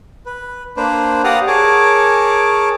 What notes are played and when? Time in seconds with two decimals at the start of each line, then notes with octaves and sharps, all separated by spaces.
0.26 B4
0.77 A#3 D4 B4 C5
1.24 G4 D5 F5 F#5 A#5 D#6
1.47 G#4 A#4 C#5 A5 D6